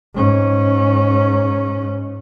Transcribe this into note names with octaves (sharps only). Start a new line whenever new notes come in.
G#2 C#4